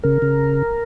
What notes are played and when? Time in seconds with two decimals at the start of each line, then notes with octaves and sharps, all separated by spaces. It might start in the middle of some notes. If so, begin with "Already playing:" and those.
0.03 C#3 A#4
0.22 C#3